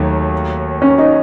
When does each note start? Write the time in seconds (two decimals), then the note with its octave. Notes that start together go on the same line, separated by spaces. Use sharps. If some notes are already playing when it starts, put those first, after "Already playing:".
Already playing: D#2 D#3 F#3 A3
0.82 C#4
0.98 D#4